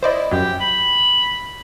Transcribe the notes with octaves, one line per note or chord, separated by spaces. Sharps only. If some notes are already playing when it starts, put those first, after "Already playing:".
E4 C5 D5 D#5
F#2 F#3 G4
B5